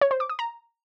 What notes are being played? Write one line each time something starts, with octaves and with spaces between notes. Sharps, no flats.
C#5
C5
D6
D#6
A#5